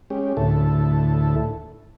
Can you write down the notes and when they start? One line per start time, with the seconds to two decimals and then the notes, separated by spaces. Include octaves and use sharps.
0.10 G#3 C#4 G4
0.37 D2 A2 E4 A4